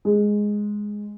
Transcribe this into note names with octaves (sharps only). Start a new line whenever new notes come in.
G#3